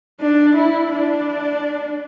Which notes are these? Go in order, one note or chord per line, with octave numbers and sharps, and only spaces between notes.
D4
E4
D4